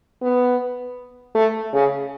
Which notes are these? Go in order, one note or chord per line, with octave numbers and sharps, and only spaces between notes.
B3
A3
C#3